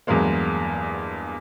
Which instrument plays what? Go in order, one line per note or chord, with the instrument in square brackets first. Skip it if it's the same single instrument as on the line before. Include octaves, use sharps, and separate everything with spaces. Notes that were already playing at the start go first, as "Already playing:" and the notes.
[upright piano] E2 G2 F#3 G#3 A#3